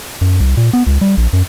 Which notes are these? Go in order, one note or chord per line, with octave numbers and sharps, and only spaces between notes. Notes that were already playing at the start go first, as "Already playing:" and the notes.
F#2
C2
A#2
B3
C#2
G3
A#1
F#2